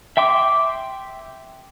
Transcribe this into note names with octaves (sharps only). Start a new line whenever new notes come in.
E5 G5 C6 D6